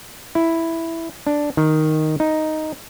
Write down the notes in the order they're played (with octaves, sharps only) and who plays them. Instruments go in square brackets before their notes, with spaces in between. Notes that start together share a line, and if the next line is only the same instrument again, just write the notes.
[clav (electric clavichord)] E4
D4
D#3
D#4